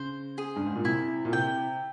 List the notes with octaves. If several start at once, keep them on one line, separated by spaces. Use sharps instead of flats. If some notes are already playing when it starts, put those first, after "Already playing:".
Already playing: C#3 C5
G#4
G2
G#2
A#2
C3 E4
A#2
C3 G5